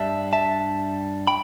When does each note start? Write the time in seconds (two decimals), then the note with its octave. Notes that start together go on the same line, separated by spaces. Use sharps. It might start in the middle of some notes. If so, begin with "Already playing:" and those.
Already playing: G2 G3 D4 E5 A5
0.33 E5 A5
1.27 G5 B5